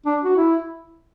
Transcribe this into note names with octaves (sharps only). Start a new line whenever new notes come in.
D4
F#4
E4